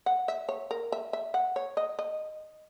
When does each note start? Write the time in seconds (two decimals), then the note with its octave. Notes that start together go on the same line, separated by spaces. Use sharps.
0.06 F#5
0.28 E5
0.49 C#5
0.71 A#4
0.92 E5
1.13 E5
1.34 F#5
1.56 C#5
1.77 D#5
1.99 D#5